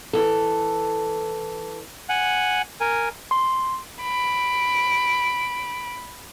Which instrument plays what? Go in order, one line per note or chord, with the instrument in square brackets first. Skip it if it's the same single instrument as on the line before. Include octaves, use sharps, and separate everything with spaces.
[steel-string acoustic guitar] E3 A4
[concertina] F#5 G#5
A#4 G#5
[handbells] C6
[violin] B5 D7